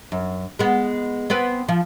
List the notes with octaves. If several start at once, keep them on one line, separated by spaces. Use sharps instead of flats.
F#2
G#3 B3
B3 C4 B4
F3